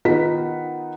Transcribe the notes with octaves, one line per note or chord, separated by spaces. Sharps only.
D#3 B3 D#4 F4 F#5 B6